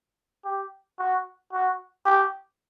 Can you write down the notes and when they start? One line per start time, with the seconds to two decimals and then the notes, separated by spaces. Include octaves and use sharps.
0.45 G4
0.99 F#4
1.52 F#4
2.05 G4